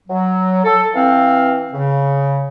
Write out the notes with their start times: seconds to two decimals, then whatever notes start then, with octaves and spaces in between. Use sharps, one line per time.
0.08 F#3
0.64 A4
0.94 E3 C4 F5
1.72 C#3